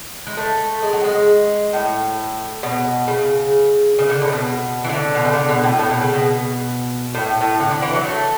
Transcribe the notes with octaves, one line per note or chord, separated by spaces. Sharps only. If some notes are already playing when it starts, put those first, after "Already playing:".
G#3
A3
G#3
F#3
G#3
A2
B2
C#3
C#3
D3
A2
C#3
B2
E3
D3
B2
C#3
D3
B2
A2
A2
B2
C#3
B2
A2
A2
D3
D3
E3
F#3
A3